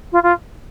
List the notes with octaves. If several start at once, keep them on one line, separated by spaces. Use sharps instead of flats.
F4
F4